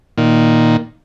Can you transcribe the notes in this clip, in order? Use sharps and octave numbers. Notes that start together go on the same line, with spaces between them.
A#2 D#3